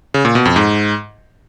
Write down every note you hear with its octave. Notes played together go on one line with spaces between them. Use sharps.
C#3
A#2
B2
F2
G#2